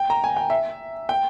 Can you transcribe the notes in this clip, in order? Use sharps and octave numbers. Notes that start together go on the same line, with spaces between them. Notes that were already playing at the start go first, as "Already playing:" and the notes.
Already playing: G5
A#5
G#5
G5
E5
G5